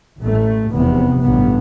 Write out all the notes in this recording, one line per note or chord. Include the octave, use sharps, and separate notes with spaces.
A1 A2 A3
F1 E2 C3 B3
A1 G2 B3